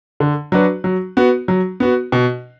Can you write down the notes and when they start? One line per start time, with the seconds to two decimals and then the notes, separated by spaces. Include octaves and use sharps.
0.20 D3
0.52 F#3 D4 F#4 B4
0.84 F#3
1.17 B3 F#4
1.48 F#3
1.80 B3 F#4
2.12 B2